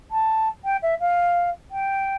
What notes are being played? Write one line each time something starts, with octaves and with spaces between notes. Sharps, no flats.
A5
G5
E5
F5
G5